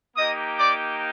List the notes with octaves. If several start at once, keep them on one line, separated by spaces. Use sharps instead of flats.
A#3 D#4 G4 D#5 D#6
D5 D6